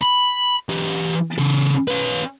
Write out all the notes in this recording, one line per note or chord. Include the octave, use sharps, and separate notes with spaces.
B5
E3 G4
C#3 A4
C#4 B4